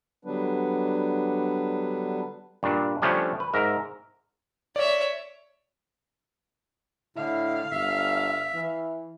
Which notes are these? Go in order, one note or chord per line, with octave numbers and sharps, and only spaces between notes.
D3 F#3 G3 B3 D4 B4
G2 A#2 D4
F3 G3 A3 C#4 D4
B4
G#2 A#4 E5
C#5 D5 E5
A2 D3 E4 F5
G1 E5
E3